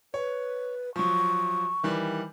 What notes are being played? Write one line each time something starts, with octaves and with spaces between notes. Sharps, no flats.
B4 C#5
F3 F#3 C#6
D#3 E3 G3